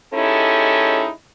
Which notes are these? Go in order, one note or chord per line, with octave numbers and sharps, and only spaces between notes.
G#3 C#4 D#4 E4 G4 A4